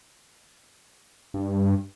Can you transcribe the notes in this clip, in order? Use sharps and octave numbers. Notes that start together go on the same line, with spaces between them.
G2